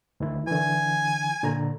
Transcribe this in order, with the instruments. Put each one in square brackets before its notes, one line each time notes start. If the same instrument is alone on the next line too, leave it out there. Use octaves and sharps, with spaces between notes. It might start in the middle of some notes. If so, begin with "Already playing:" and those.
[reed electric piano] D2 D#3 E4
[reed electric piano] D3 E3 [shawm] G#5
[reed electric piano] A#2 D3 A#5